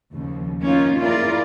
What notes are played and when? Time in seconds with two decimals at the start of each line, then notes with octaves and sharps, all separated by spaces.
0.13 D#2 C#3 F3
0.61 A#3 C#4 D#4 F4
1.01 E4 F4 G#4 A#4 D5